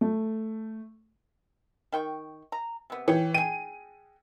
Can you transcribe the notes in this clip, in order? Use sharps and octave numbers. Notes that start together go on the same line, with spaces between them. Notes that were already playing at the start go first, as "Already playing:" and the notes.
A3
D#3 G5 C#6
A#5
C3 B3
E3 C#5 G5
G#4 G5 D#7